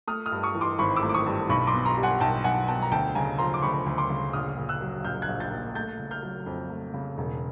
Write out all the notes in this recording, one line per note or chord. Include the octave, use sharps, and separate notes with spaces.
A3 D#6 F6
D#6 F6
G2
C#6 D#6
E3
C6 D6
G#1 B5 C#6
D6 E6
A3
D6
C#6 D#6
G2
B1 B5 C#6
C6 D6
B2
A#5 C6
G3
F#5 G#5
B1 G5 A5
B1 F#5 G#5
B2 G5 A5
A#5
D2 G5 A5
C#3 G#5 A#5
F3 A#5 C6
D6
D2 B5 C#6
D2
C6 D6
C#3
A#1 D#6 F6
A#2
E6 F#6
F#3
A#1 F6 G6
F#6 G#6
A#1
G6 A6
A#2
A3 G6 A6
C#3
F6 G6
F#3
F2
A3
C#3
E1